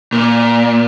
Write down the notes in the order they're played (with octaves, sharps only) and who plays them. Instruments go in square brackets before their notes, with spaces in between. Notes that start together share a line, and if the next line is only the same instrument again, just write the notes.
[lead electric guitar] A#2